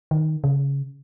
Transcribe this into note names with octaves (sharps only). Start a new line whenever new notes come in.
D#3
C#3